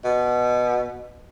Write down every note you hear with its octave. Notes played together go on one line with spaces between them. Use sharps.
B2